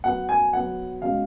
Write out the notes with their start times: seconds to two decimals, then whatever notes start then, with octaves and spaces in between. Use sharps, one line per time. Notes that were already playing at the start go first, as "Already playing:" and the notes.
0.04 F#3 B3 F#4 B4 F#5
0.29 G#5
0.53 F#3 B3 F#4 B4 F#5
1.01 B2 G#3 C#4 F#4 F5